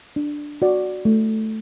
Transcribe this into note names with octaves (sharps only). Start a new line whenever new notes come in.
D4
F#4 D5
A3